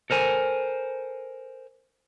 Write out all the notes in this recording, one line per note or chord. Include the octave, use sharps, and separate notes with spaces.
A4 A#4 C5 G#5